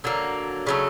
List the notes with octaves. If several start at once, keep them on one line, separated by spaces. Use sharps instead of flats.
D3 F#3 A#3
C#3 F#3 A3